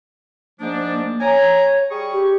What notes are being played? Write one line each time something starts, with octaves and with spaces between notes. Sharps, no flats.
G#2 F3 A#3 D4
C#5 G#5 A#5
G3 G#4 C#6
G4